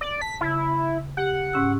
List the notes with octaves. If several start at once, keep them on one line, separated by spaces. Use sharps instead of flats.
D5
A5 B6
C#3 E4
G4 F#5
G#2 C#4 E6